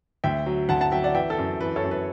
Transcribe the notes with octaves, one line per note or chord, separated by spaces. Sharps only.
D2 E5 G5
F#3
D2 F#5 A5
F#5 A5
F#3 E5 G5
D5 F#5
E3 E5 G5
A4
F#2
E3 B4
A4 C#5
F#2
B4